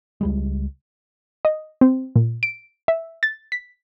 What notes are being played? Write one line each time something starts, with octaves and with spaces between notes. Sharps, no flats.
C#2 G3 G#3
D#5
C4
A#2
D7
E5
A6
B6